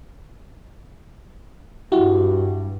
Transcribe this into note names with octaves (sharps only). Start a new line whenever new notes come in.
G2 E4 F#4 G4